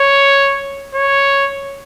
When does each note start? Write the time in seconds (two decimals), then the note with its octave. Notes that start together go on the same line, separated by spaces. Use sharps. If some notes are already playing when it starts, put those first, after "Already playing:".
Already playing: C#5
0.95 C#5